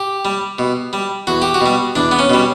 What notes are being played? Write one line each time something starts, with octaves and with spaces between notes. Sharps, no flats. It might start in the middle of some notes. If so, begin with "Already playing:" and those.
Already playing: G4
G3
B2
G3
E2 F#4
G4
F#4
B2 G3
E2 D4
B3
C#4
B2 G3